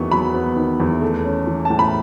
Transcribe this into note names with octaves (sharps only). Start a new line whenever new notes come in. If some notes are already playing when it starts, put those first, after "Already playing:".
Already playing: E2 D#3 F#3 B3 C#6
F#3 B5
B3
D#3
E2
A3
C#4
E3
A2 A5
B5